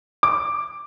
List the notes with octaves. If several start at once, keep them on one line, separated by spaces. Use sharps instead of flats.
D6